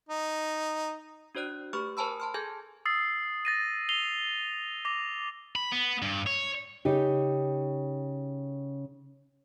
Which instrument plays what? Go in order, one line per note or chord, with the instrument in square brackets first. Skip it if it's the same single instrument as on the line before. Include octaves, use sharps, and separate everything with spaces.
[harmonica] D#4
[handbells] D4 F#4 C5 D5 F#6
A3 G4 B4 B5 C#6 F6
A#4 C5 G#5 A5 B5 E6
A5 C6 F6
G#4 A4 G#5 G6 G#6
[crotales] D#6 E6 A6 C7
A6 A#6 D#7
C7 F7 G7
D6 A#6 F7
[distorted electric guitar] B5
B3
G2
C#5
[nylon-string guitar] C#3 D#4 G4